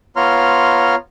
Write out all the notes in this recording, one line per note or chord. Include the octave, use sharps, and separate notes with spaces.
B3 F4 C#5 A#5 C6 F6